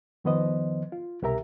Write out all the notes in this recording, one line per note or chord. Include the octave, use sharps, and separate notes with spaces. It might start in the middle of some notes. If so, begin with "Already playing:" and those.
F2 D#3 F3 B3 C5 D#5
F4
C2 B2 G4 A#4 E5 A#5